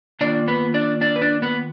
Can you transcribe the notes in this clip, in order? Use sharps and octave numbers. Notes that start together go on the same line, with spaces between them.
D#3 A#3 D4 F4 D5
B3 B4
D4 D5
D4 D5
B4
D4 D5
B3 B4